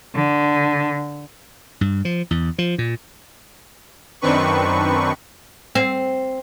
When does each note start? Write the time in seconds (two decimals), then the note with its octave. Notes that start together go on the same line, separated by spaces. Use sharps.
0.13 D3
1.81 G2
2.05 F3
2.31 E2
2.58 F3
2.78 A#2
4.21 F#2 D#3 C4 D4 B4 C#6
5.75 C4